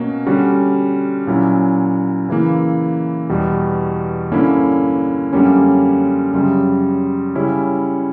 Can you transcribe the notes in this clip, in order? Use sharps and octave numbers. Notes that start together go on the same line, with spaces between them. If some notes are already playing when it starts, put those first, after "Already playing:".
Already playing: B2 A#3 C#4 F#4
D3 G3 C#4 F#4
A#2 F#3 C#4 E4
C#3 E3 A#3 E4
E2 B2 G3
G2 D3 A#3 C#4 E4
F#2 D3 G3 A#3 C#4
F#2 C#3 G3
C#3 G3 C#4 E4